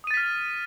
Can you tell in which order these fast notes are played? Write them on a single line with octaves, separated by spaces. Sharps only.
D#6 D#7 A6 B6 F6